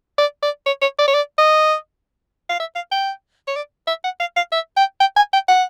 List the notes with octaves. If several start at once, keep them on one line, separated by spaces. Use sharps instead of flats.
D5
D5
C#5
C#5
D5
C#5
D5
D#5
F5
E5
F5
G5
C#5
D5
E5
F#5
F5
F5
E5
G5
G5
G#5
G5
F#5